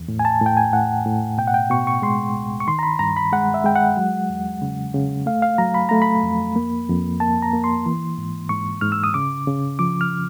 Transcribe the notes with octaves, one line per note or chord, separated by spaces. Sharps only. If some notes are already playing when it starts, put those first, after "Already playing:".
Already playing: E2
A2
G#5
A5
A2 G5
G#5
A2 F#5
A2
B2 G5
F#5
G5
B2 C#6
C#6
G#3 C6
C#2
C#6
D#3 C6
A#5
B5
G2 A#5
B5
G#3 F#5
E5
G#3 G5
F#5
F#3
E2
C#3
C#3
A3 F5
F5
F#3 A#5
B5
A3 A#5
B5
F2
A#3
F2
A#3 A5
A#5
A#3
C6
E3
G#2
G#2 C#6
G#2 F6
E6
D#6
C#3 D6
C#3
F3 D6
F6